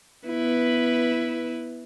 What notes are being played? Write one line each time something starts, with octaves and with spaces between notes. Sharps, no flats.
B3 E4 B4